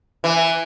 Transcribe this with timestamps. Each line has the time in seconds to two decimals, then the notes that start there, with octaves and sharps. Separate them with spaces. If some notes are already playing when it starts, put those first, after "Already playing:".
0.24 E3